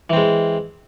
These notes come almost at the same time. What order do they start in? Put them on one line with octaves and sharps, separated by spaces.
E3 C4 G#3